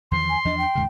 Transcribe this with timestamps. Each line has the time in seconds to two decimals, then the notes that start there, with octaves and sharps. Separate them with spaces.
0.11 E2 D#3 F3 C6
0.29 G#5
0.45 E2 F3 D4 D#5
0.58 G5
0.75 D#2 G#2 C#3